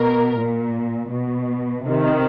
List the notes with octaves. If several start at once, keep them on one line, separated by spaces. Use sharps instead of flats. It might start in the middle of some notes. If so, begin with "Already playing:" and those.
Already playing: B2 A#4
A#2
B2
C3 D#3